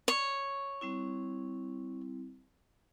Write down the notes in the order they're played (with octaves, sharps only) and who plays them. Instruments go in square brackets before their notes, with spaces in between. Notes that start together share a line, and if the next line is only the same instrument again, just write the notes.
[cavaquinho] C#5
[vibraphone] G3 C4 E4